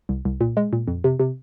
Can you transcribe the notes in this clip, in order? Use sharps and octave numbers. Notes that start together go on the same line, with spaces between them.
C2
C2
A#2
G#3
A#2
F2
C3
C3